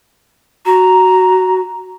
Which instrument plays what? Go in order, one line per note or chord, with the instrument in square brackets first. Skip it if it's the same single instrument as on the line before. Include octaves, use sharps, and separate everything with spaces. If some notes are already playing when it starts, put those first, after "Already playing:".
[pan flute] F#4 [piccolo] A#5